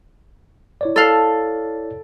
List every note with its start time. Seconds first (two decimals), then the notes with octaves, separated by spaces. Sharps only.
0.81 E4 C#5 D5
0.96 A4 F5